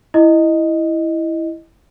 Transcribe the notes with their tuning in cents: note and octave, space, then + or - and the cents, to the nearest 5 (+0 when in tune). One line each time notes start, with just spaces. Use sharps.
E4 +0 D#5 +0